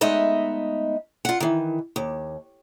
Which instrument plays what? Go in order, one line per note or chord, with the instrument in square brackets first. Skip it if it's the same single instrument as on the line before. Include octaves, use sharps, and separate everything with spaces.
[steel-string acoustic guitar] G#3 A3 B3 D#4 D#5 E5
F4 F#5
D#3 E3
D#2